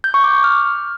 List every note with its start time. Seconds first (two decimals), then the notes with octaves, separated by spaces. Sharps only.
0.04 G6
0.14 C#6
0.24 D6
0.34 C#6
0.44 F6